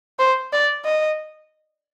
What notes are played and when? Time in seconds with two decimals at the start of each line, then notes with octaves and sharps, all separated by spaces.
0.19 C5
0.53 D5
0.85 D#5